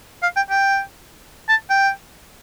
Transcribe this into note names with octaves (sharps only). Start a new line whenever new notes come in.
F5
G5
G5
A5
G5